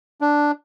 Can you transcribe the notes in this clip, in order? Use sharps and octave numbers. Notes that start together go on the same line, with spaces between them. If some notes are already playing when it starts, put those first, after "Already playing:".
D4